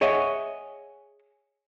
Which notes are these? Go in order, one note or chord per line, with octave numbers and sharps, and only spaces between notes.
G#4 C#5 D#5 E5 F#5